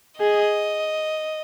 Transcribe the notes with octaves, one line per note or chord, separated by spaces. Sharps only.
G#4 D#5